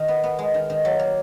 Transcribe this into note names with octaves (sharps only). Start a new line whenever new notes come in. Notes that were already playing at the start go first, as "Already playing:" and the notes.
Already playing: D#3
B3
B3
G#3
D#3
D#3
F#3
A#3